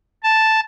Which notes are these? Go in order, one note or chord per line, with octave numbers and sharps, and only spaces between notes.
A5